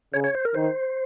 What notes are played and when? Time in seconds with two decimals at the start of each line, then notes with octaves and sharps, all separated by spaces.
0.14 C#3 C#5
0.24 C#5
0.35 C5
0.45 A#4
0.55 D#3 C5